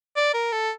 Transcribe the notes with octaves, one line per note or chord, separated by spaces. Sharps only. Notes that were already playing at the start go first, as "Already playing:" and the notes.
D5
A#4
A4